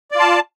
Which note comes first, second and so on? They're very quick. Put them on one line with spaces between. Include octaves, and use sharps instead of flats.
D5 F4 A5